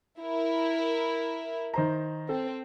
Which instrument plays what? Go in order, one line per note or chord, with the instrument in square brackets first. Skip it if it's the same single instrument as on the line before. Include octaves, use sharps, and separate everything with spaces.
[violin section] E4 A#4
[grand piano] D#3 C5 A#5
[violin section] C4 [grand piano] A4